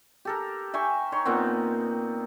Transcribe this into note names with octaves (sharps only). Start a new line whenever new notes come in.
G4 A4 A#4
E5 G5 G#5 C#6
D#4 C#5 C6
A#2 B3 C4